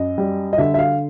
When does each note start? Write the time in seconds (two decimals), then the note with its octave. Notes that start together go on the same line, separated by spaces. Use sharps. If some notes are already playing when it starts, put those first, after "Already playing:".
Already playing: F#2 D#5
0.18 G3
0.53 D#5
0.58 D3 E5
0.74 E5
0.79 F5